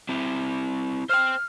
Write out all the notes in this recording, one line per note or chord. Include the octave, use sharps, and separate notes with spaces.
C4 E4
C5 G5 F6